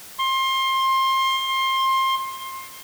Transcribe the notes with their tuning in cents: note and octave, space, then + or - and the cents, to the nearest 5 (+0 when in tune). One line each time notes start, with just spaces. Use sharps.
C6 +25